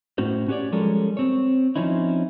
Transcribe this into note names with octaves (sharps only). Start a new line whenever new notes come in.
A2 C#4 F#4 C5
C#4 F#4 G4 B4 C#5 D5
F3 G3 G#3 C#4 A4 A#4
C4 C#5
F3 C4 C#4 D#4 E4